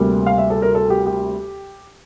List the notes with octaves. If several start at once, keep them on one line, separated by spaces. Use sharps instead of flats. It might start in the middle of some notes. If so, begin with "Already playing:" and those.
Already playing: D2 C3 G3 A#3
F5
E5
A4
A#4
A4
G4
G4